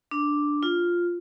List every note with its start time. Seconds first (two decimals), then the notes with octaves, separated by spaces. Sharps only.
0.11 D4
0.63 F4